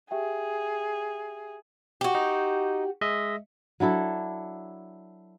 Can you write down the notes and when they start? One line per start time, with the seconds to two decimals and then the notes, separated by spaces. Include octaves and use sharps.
0.11 G4 G#4 E5 G5
2.01 F#4 G4
2.15 D#4
3.01 G#3 D#5 E5
3.80 F#3 D4 E4 A4